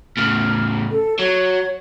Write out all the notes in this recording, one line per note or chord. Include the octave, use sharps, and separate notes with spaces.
A2 C#3 F6
A4
F#3 C#5